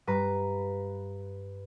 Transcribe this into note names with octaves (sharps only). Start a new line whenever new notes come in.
G2 B4 A#5